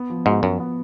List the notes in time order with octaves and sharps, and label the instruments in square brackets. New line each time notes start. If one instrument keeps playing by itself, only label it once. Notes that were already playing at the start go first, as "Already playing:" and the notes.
Already playing: [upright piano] B3
F3
[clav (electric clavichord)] G#2 [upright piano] F#4
[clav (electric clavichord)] F#2 [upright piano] F3
[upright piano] B3